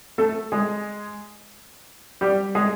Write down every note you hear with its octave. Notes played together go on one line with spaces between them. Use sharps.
A3 A4
G#3 G#4
G3 G4
G#3 G#4